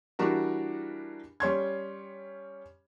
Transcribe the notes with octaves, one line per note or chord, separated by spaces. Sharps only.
E3 G3 D4 F#4 A#4
G3 C#4 C6 G#6